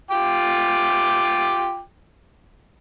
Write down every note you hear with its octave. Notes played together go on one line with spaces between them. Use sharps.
F4 G5 D6